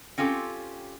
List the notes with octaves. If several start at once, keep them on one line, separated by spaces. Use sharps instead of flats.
C4 C#4 F4 G4 A4